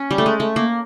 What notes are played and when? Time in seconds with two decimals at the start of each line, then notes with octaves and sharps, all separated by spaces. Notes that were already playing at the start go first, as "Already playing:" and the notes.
Already playing: C#4
0.11 G3
0.18 A3
0.26 G#3
0.40 A3
0.56 A#3